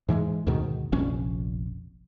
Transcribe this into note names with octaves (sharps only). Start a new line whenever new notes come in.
G#2 E3 F3 G#3
D2 G#2 B2 D#3
F1 A#1 F2 C#4